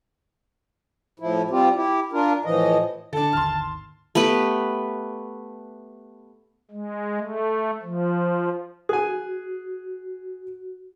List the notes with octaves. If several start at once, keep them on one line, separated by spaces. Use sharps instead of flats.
A2 F3 E4
G3 C4 F4 G4
E4 G4
D4 F4 A#4
A2 E3 F3 D#5
D3 D4 A4 A5
G#1 D#2 C6 F6
A3 B3 G4 B4
G#3
A3
F3
F#4 G#4 G#5